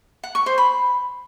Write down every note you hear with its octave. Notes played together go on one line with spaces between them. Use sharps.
F#5
C#6
C5
B5